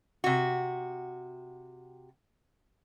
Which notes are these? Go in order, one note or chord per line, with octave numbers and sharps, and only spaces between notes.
C3 F#4